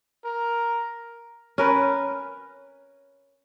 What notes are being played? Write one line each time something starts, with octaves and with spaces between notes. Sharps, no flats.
A#4
C#4 A#4 B4